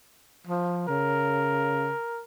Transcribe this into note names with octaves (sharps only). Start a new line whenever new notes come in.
F3
C#3 A#4